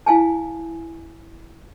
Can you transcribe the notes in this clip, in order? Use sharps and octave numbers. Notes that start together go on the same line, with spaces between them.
E4 F5 G#5 A5